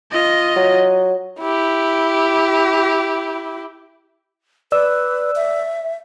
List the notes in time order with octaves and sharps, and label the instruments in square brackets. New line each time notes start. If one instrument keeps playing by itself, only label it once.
[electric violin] F4 D#5
[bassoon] F#3
[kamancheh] E4 G4
[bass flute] B4 [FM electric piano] D5 E6
[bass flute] E5